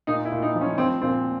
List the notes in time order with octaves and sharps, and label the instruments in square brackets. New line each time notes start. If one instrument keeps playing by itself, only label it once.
[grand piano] A#2 D#4
E4
A#2
D#4
F3
C#4
F3 C4
A#2 C4